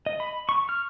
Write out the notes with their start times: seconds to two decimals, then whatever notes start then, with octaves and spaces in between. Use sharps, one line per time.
0.06 D#5
0.20 B5
0.49 C#6
0.69 F6